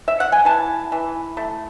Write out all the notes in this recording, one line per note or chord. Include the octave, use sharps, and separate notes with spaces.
E5
F#5
G#5
E3 A5
E3
A3